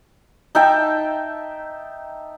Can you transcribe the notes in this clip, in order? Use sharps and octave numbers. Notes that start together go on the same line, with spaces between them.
D#4 E5 G5 A5